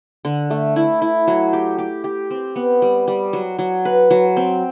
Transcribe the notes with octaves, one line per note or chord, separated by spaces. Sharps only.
D3
A3
E4
E4
F#3
G4
G4
G4
C4
B3
G3
G3
F#3
F#3
B4
F#3
C4